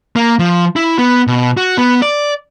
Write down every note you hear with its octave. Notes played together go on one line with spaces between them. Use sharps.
A#3
F3
E4
B3
B2
F#4
B3
D5